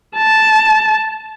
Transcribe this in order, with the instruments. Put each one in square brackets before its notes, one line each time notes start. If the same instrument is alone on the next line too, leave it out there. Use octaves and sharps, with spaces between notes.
[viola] A5